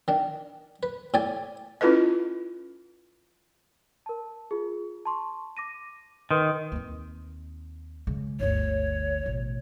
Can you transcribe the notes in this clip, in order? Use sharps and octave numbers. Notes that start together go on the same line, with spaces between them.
D#3 D4
B4
A2 G4 D5 G#5
C#4 E4 F4 A4 B4 D#5
A#4 A5
F4 G#4
A5 C6 C#6
D6 A#6 D#7
D#3 B4 C6 D#6
D#2 C4
C#3 G#3
G1 D2 C#5
A1 B2